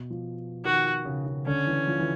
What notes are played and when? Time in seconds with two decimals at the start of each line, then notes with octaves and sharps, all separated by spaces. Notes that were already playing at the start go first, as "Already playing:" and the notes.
Already playing: B2
0.10 F3
0.65 D#3 F#4
1.05 C#3
1.26 C#3
1.46 D3 C#4
1.67 E3
1.87 F3
1.99 E3